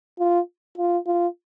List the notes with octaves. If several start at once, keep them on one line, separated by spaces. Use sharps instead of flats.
F4
F4
F4